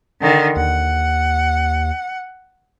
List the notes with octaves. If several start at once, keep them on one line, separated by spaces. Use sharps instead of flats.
D3 D#3
D#2 F#5